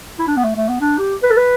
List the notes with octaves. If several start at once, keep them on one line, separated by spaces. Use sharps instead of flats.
E4
D4
B3
A3
A3
B3
D4
G4
B4
A4
B4